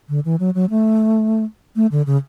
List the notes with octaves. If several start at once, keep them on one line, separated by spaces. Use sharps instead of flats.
D3
E3
F#3
F#3
A3
A3
D3
C#3